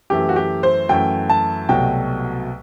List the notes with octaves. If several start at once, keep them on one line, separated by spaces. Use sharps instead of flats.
F#2 E3 A3 G4
F#4
G4
C5
F#2 E3 A3 G5
A5
C2 B2 F#3 A3 G5